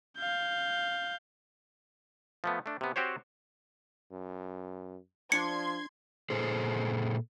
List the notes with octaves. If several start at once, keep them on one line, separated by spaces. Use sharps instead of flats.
F5 G6
F3 A3 B3
A3 D4
C3 B3
C4 F#4 G4 C5 C#5
F#2
F3 D4 C6 G#6 C#7
A#2 G#4 A4 C5